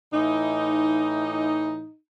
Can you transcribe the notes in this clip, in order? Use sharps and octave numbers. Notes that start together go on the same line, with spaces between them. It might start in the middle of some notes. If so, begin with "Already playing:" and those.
A2 E3 D#4